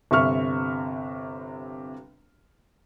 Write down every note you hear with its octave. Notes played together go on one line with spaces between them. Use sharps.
G1 C3 E5 C#6 F6